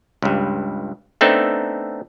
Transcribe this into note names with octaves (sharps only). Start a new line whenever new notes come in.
C#2 G2
A3 B3 C4 D4 D#4 A4